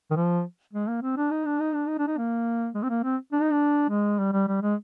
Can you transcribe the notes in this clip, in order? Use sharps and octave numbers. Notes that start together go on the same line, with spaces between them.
D#3
F3
G#3
A#3
C4
D4
D#4
D4
D#4
D4
D#4
D4
D#4
A#3
G#3
C4
A#3
C4
D4
D#4
D4
G#3
G3
G3
G3
G#3